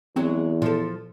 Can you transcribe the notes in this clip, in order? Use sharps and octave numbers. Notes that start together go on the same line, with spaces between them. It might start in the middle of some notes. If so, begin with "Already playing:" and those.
E2 F#3 G#3 C4
A#2 F3 A4